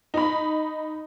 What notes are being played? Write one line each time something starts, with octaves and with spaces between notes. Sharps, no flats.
D#4 B5